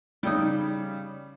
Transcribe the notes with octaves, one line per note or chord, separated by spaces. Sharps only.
C#3 G3 D#4 E4 G5